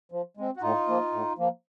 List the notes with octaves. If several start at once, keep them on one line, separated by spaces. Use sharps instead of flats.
F3
G#3 C4
F#4
A2 D#4 F4
F3 A#3
A2
F3 A#3